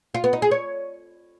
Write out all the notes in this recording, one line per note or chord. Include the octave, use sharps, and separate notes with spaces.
F4
B3
D#4
G#4
C#5